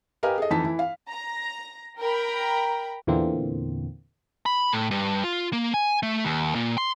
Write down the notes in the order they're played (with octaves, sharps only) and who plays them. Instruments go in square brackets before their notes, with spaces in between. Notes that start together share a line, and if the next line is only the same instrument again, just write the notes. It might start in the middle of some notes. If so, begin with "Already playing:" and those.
[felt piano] G4 A#4 B4 D#5 F5 G#5
G#4 A4 D#5
F2 E3 D#4 A5 B6
E3 E4
F5
[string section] A#5
A#4 G5 A#5 B5
[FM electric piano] E2 A#2 D3 E3 A#3 C4
[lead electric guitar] B5
A2
G2
F4
A#3
G#5
A3
D#2
A#2
C6